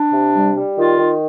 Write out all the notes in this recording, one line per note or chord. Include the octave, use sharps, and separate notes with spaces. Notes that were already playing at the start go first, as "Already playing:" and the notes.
Already playing: D4
C3
G3
G3
D#3 F4
D#3